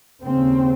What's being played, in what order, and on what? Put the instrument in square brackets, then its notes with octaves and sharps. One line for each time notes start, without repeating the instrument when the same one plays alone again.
[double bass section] D#2 C#3 C4